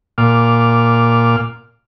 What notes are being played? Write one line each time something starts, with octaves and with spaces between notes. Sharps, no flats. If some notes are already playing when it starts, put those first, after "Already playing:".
A#2 D6 F6